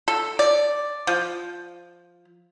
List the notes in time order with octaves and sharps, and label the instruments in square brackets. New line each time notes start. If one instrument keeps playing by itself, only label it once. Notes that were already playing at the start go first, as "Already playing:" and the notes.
[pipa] A4
D5
F3